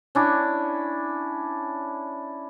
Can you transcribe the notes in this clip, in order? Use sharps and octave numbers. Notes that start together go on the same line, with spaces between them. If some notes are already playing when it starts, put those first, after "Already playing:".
C#4 D4 E4